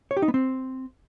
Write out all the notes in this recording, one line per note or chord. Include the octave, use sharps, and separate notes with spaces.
C#5
G4
D#4
B3
C4